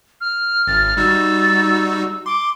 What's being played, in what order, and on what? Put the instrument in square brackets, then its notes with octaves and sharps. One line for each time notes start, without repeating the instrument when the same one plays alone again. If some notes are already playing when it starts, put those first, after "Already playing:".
[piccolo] F6
[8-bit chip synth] G#1 [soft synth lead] A6
[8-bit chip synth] G3 D#4 F#4 [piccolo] E6
[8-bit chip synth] C6 [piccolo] D6